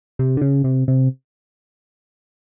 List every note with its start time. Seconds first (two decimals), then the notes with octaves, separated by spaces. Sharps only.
0.19 C3
0.37 D3
0.41 C#3
0.64 C3
0.88 C3